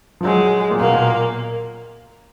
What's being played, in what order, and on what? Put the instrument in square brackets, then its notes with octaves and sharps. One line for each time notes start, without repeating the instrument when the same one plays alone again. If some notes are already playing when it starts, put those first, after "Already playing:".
[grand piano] F3
[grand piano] F#3 [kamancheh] G#3
[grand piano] A#2
[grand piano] B2 [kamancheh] A#3
[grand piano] A#2